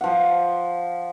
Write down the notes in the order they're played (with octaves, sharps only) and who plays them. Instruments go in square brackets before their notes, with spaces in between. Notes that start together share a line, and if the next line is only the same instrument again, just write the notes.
[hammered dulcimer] F3 F#5